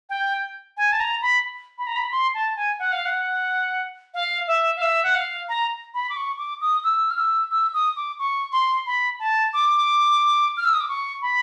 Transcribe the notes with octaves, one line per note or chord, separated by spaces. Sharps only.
G5
G#5
A5
A#5
B5
B5
A#5
B5
C6
A5
G#5
F#5
F5
F#5
F5
E5
F5
E5
F#5
F5
A#5
B5
D6
C#6
D6
D#6
E6
F6
E6
E6
D#6
D6
C#6
C6
B5
A5
D6
F6
E6
D#6
D6
C#6
B5